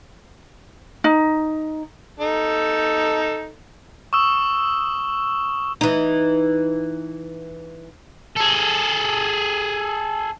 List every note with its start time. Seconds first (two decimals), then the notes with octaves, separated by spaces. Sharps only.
1.04 D#4
2.20 D#4 A4
4.13 C#6 D#6 E6 E7
5.81 E3 D#4
8.36 G#4 A4